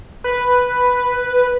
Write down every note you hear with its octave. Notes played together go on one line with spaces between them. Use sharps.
B4